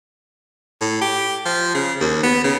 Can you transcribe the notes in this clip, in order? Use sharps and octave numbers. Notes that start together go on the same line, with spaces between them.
A2
G4
F3
C#3
D#2
B3
C#3